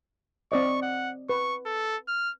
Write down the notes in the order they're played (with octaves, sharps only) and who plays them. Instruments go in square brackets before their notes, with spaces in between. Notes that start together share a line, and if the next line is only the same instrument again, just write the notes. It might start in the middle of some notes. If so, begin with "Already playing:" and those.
[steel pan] C4 D5 D#5 [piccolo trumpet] C#6
[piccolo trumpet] F#5
[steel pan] B4 [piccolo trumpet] C#6
[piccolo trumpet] A4
F6